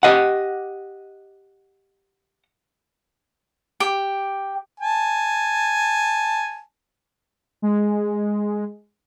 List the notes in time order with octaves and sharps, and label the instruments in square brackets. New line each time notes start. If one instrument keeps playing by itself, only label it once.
[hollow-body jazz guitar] G4 D#5 F#5
[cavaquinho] G4
[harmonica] G#5 A5
[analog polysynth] G#3